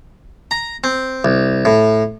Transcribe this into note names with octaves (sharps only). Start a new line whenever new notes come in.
A#5
C4
C2
A2